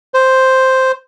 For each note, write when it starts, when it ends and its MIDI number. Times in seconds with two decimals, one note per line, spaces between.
0.14 0.92 72